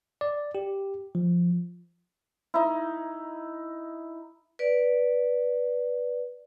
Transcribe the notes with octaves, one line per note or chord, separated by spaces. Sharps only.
D5
G4
F3
D#4 E4
B4 D5